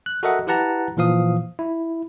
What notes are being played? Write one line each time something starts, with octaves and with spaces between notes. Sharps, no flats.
F#6
F#4 A4 A#4 D#5 E5 F#5
E4 G4 B4 F#5 A5 A#5
A#2 E3 F3 F5 D#6
E4